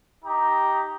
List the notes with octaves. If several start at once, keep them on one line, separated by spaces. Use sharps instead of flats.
D#4 G4 A#5